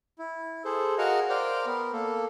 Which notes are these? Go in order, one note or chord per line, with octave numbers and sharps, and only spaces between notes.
E4
G#4 A4 C5
F#4 G#4 A#4 D#5 F5 F#5
A#4 C5 D5 F5 G5
B3 A#4
A#3 A4